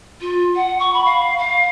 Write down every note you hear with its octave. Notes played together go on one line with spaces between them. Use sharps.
F4
F#5
C#6
B5
F5
F5